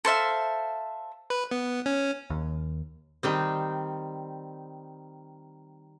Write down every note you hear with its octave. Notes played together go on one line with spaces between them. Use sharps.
A4 C5 E5 F5
B4
B3
C#4
D#2
D#3 G3 C4